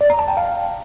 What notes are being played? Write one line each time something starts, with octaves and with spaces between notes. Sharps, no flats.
D5
A#5
A5
G5
F5